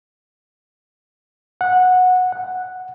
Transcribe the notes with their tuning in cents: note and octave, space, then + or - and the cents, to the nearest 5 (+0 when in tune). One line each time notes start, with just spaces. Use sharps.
F#5 -15
F#5 -5